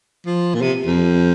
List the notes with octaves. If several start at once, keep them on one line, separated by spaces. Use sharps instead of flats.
F3
A#2
C3
F2